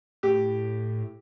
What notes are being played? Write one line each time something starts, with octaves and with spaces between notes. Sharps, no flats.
A2 G4